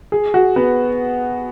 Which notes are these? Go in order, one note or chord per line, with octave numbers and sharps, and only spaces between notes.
G#4
F#4
B3